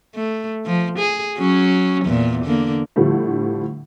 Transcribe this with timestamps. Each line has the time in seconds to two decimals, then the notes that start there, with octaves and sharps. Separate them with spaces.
0.15 A3
0.66 F3
0.98 G#4
1.37 F#3 C#4
2.04 E2 A#2
2.44 D3 A#3
2.96 A2 D3 F3 G3 A3